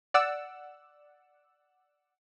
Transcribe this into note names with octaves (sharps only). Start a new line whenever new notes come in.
D5 F#5 E6